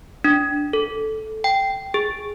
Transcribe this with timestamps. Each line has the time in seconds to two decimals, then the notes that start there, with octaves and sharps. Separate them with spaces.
0.24 D4
0.73 A4
1.44 G5
1.94 G#4